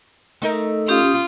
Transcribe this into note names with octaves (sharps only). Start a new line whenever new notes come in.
A3 D#4 A#4
C#4 F4 G4 D#6